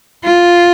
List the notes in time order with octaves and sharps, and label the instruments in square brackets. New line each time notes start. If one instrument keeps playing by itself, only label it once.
[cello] F4